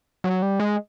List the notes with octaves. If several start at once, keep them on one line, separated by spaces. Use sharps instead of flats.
F#3
G3
G#3